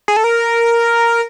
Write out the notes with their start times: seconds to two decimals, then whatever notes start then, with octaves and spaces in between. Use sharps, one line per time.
0.08 G#4
0.17 A4
0.24 A#4